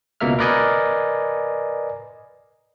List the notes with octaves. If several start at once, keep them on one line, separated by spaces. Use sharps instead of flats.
C#2 B2 A#3 A#4 E5 F6
A#4 B4 D5 D#5 G#5